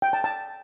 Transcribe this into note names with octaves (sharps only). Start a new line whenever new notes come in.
G5
A5
A5